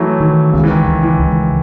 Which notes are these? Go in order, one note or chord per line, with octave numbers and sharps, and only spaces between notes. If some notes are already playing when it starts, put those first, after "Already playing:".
Already playing: E3 F#3 A3 E4
D#3
C#2 C#3
E3
D#3
C#2
E3
C#2